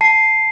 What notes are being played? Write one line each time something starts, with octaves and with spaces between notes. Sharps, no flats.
A5 C7